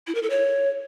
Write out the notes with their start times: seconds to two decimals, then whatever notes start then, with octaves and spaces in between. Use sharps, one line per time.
0.07 E4
0.15 A#4
0.22 A4
0.30 C#5